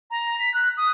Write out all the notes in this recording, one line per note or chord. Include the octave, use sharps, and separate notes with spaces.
A#5
B6
F#6
D#6